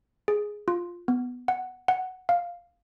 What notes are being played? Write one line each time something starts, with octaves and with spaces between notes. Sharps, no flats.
G#4
F4
B3
F#5
F#5
F5